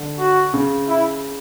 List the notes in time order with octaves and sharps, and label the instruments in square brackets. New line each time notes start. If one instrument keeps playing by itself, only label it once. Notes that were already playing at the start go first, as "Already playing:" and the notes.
Already playing: [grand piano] D3 D4
[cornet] F#4
[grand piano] C#3 C#4
[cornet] E4